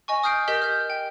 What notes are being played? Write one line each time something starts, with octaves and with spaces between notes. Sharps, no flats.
D#5 G#5 C#6
D#6 F6 G6 C7 D7
G4 A#4 D#5 G6 B6
F6 G6
G5